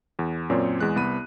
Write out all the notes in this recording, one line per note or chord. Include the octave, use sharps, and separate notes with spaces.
E2
F#2 A#2 C4 C#5 D5
E2 G#3 F#6
C2 B3 B5 D#7